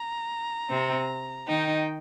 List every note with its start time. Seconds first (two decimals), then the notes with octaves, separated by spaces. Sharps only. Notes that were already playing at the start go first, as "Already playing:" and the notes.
Already playing: A#5
0.69 C3 C4
1.48 D#3 D#4 G5